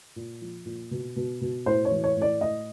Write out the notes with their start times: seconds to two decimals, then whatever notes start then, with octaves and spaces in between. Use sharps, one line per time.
0.16 A#2
0.41 F3
0.66 A#2
0.91 B2
1.16 B2
1.41 B2
1.66 A2 C5
1.85 C#5
1.92 E3
2.04 C#5
2.16 A2
2.22 D5
2.40 A2 D#5